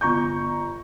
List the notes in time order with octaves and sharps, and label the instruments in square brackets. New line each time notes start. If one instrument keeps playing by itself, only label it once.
[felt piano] G1 A#5 C#6 G6